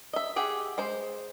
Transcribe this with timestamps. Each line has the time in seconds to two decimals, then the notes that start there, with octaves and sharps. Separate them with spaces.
0.13 D#5 E5
0.36 G4 G#4 F#5
0.78 G#3 C5